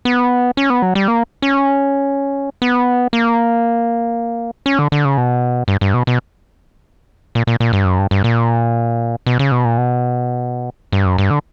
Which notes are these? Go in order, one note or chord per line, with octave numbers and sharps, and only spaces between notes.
B3
C#4
B3
F#3
G3
A#3
C#4
B3
A#3
C#4
D3
D3
C#3
B2
G2
G2
B2
B2
A#2
A#2
A#2
G2
F#2
G2
G2
A#2
B2
C#3
B2
A#2
B2
G2
F#2
G2
D3